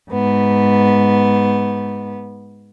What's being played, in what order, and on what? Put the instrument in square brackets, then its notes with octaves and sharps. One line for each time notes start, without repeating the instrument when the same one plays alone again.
[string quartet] G#2 B3